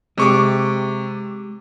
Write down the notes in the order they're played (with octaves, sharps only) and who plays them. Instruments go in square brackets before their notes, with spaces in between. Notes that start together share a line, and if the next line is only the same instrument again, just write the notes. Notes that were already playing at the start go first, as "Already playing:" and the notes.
[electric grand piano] C3 C#6 D6 [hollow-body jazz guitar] G#3 G4